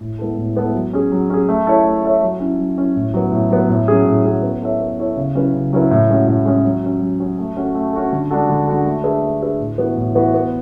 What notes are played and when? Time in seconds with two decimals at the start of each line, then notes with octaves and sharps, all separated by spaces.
0.01 A2
0.19 G#3 B3 E4 A4
0.38 A2
0.56 G#3 B3 E4 A4
0.74 F#3
0.93 C#4 G#4
1.12 F#3
1.30 C#4 G#4
1.49 A3
1.67 E4 A4 C#5 E5
1.85 A3
2.03 E4 A4 C#5 E5
2.22 F#3
2.40 C#4 E4
2.58 F#3
2.78 C#4 E4
2.96 A2
3.14 F#3 B3
3.32 A2
3.50 F#3 B3
3.69 A2
3.88 F#3 C#4 G#4
4.06 A2
4.24 F#3 C#4 G#4
4.43 B3
4.62 E4 A4 C#5 E5
4.81 B3
4.98 E4 A4 C#5 E5
5.17 C#3
5.35 F#3 C#4 E4 B4
5.54 C#3
5.73 F#3 C#4 E4 B4
5.91 A2
6.10 G#3 C#4 F#4
6.27 A2
6.46 G#3 C#4 F#4
6.65 F#3
6.83 C#4 F#4
7.01 F#3
7.20 C#4 F#4
7.39 A3
7.57 C#4 F#4 A4
7.75 A3
7.93 C#4 F#4 A4
8.13 D3
8.31 G#3 D4 F#4 A4
8.49 D3
8.67 G#3 D4 F#4 A4
8.86 A3
9.04 D4 G#4 B4 E5
9.23 A3
9.42 D4 G#4 B4 E5
9.60 A2
9.78 E3 B3 F#4 B4
9.97 A2
10.15 E3 B3 F#4 B4
10.34 B3